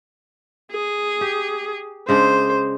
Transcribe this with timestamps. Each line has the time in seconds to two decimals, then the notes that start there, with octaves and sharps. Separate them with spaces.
0.72 G#4
1.21 G4
2.09 C#3 G#3 D4 C5